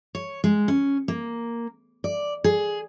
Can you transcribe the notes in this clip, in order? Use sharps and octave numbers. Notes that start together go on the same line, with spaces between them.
C#5
G#3
C#4
A#3
D5
G#4